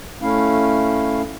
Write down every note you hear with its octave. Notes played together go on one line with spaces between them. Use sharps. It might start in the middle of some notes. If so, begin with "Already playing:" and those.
A3 C#4 E4 F5